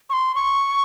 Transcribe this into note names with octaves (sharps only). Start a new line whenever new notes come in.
C#6
C6
C#6